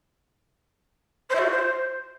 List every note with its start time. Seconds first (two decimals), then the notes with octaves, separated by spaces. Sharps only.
1.29 C5
1.34 E5
1.40 F#4
1.45 F4
1.50 C5